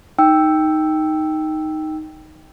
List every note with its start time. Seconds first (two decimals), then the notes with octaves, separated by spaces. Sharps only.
0.19 D#4 G5 E6